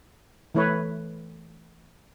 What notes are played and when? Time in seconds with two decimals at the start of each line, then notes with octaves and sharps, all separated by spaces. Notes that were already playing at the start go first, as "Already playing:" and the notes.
0.55 E3 A3 E4 B4 C#5